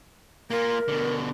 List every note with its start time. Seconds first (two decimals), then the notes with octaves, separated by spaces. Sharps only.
0.51 A#3 F4 A#4
0.88 B2 D3